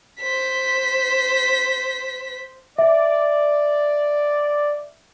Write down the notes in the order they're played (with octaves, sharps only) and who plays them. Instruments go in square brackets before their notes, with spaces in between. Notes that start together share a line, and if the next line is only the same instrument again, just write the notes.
[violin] C5 B6
[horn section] D5 [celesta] E5